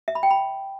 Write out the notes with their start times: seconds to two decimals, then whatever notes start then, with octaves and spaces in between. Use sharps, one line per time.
0.08 E5
0.15 B5
0.23 G5
0.31 B5